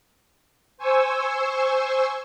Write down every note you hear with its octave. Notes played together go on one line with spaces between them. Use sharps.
C5 G#5 C#6 E6